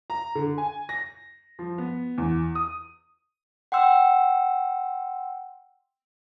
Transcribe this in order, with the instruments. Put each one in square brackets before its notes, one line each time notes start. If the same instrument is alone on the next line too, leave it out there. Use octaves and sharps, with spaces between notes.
[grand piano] A#5
D3
G#5
A#6
F3
B3
E2
D#6
[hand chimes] F#5 G5 C6 E6